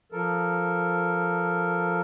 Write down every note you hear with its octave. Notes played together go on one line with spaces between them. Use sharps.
F3 A4 A#4